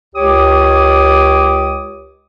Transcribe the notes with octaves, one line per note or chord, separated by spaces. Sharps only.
C#2 G4 C#5 D6 D#6